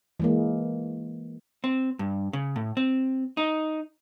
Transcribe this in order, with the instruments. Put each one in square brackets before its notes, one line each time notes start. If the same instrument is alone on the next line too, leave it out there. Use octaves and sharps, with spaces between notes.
[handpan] E3 G#3 A#3
[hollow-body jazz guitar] C4
G2
C#3
A2
C4
D#4